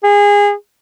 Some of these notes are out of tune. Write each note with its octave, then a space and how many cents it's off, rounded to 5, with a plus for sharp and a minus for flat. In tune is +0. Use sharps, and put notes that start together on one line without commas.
G#4 -25